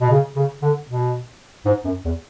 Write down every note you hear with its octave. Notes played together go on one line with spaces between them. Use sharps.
B2
C#3
C#3
D3
B2
G#2
F#2
E2